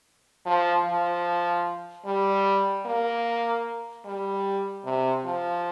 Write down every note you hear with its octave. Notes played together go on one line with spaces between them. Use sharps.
F3
F3
G3
A#3
G3
C3
F3